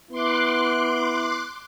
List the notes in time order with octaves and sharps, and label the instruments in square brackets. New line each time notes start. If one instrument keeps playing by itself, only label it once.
[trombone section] B3 E4 [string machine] C6 D6 F#6